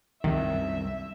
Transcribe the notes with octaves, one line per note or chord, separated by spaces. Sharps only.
C2 F#2 D#3 E5